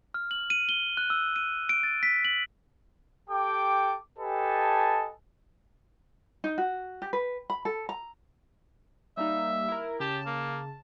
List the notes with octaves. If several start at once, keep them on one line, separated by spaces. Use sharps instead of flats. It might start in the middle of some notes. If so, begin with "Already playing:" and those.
F6
F#7
D#7
G7
F#6
E6
D#7
D7
A6
B6
F#7
G4 A4 G5 D6
G4 A4 B4 D#5 G#5 A5
D#4
F#4
G4
B4
B5
A4
A#5
G3 A#3 D#4 E5
E4 A#4
C#3 G4 A5
A#3